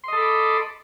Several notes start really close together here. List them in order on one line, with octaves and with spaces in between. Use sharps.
C6 D#5 A4 B5 D6